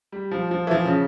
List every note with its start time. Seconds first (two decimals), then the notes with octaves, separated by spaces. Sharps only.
0.12 G3
0.31 F3
0.51 F3
0.67 E3
0.71 F3
0.85 C#3